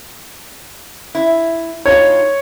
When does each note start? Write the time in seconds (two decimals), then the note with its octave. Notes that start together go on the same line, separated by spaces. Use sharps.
1.15 E4
1.85 A2 D#4 F4 C#5